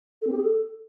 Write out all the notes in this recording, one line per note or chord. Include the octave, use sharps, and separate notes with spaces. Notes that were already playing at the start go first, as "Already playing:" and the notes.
A4
C4
G4
G#4
A4